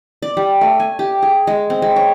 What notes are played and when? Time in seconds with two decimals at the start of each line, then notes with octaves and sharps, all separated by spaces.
0.22 D5
0.37 G3
0.61 A3
0.80 G#5
0.99 G4
1.23 G#4
1.47 G#3
1.70 C4
1.82 G#3
1.96 C#5